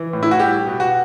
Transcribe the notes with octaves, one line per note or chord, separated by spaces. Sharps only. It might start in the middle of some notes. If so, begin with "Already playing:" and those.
Already playing: E3
A2
E4
F#4
G3 G4
B2
F#4